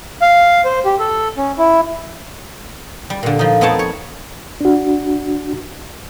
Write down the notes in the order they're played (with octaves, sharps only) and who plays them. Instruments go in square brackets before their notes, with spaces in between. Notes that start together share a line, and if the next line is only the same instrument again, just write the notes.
[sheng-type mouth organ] F5
C5
G4
A4
C#4
E4
[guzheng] G3
A#2 D3
F3 D#4
F2 B3 C4 D#4 C#5 A5
C#5
[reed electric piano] D4 F#4